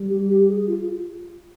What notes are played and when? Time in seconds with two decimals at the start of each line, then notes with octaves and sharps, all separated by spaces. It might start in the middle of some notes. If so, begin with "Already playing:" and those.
Already playing: G3
0.10 G4
0.30 G4
0.49 G#4
0.67 F4